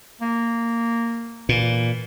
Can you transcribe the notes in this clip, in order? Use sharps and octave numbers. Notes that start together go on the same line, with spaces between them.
A#3
A#2 E3